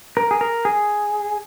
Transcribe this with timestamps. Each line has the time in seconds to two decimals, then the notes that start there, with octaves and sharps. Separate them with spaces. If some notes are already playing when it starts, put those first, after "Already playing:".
0.17 A#4
0.31 G#4
0.41 A#4
0.65 G#4